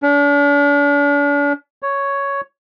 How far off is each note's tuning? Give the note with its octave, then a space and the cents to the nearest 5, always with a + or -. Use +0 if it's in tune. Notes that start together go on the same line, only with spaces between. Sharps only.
D4 -40
C#5 +5